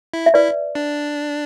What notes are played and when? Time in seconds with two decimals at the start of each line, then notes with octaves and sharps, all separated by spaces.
0.14 E4
0.26 E5
0.34 E4 B4 D5
0.75 D4